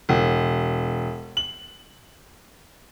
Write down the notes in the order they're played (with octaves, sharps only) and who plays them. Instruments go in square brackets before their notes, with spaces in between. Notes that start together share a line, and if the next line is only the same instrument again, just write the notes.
[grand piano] E1
F#7